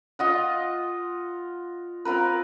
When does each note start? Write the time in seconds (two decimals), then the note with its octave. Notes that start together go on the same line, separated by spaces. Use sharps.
0.19 F4 D#5 F#5
2.05 C4 F4 A#4 B4